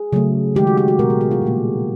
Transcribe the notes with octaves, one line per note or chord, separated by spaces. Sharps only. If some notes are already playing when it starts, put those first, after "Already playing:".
Already playing: G#4
C#3 F#3 A3
D#3 G#3 G4
F#4
G4
F#4
B2 G#3 A#4
G#4
F#4
F4
A#2 G3 A#3